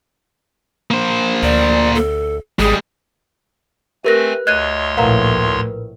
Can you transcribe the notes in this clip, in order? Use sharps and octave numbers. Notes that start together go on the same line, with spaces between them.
A#3 C5
D2 D5
A4
G#1 G3 G#3 G#4
A3 C4 G4 A#4 B4 G#5 F#6 A#6
D2 C#5 D#5 C6 F#6 G#6 A6 D#7
A#1 A2 A#4 B4 F5 F#5 A#5